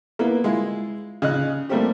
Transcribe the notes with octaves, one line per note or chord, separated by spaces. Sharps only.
A#3 B3 E4
G#3 E4 F4
C#3 D#5 F#6
G3 A3 A#3 C4 G4